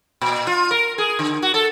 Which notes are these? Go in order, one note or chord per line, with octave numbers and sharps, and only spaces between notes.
A#2
F4
A#4
G#4
D3
F#4
A4